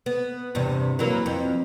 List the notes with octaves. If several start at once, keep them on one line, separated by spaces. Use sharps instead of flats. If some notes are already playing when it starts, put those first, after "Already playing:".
B3
E2 G2 C3
E3 F#3 A#3
F2